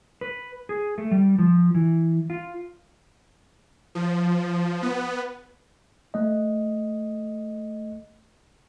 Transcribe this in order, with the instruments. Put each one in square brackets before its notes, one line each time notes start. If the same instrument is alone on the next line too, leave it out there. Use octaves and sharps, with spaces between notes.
[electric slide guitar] B4
G#4
A3
G3
F3
E3
F4
[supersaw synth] F3
B3
[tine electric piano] A3 D#5